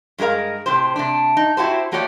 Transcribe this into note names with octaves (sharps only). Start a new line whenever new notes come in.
G2 G#3 F#4 A#4 F5
A2 C3 G4 C5
C3 A3 D4
D#4
E4 F#4 G4 C5
A3 A#3 F#4 G4 C#5 D5